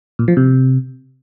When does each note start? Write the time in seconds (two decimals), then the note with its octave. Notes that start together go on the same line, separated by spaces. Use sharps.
0.19 A#2
0.28 F3
0.37 C3